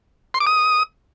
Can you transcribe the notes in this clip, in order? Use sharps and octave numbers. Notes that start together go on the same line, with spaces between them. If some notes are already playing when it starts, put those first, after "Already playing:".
C6
D6
D#6